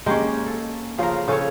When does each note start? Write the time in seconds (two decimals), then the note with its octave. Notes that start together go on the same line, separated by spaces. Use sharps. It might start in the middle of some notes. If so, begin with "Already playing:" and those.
0.06 G#3 A#3 C#4 G4 G5
0.47 A4
0.98 C#3 F3 F4 G#4 A#4
1.28 C#3 C#4 A4 C#5